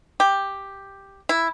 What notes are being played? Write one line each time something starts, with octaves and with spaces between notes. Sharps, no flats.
G4
E4